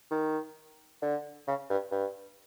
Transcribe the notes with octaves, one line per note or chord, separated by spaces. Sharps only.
D#3
D3
C#3
G2
G2